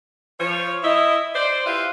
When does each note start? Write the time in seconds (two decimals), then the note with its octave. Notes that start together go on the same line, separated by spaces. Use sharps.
0.40 F3 C#5
0.84 E4 D#5 E5
1.35 C5 D5
1.66 E4 F4 G4 B4 C5 F5